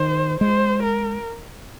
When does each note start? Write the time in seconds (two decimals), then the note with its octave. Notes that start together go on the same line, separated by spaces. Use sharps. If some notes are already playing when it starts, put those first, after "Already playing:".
Already playing: D#3 C5
0.40 G#3 C5
0.83 A#4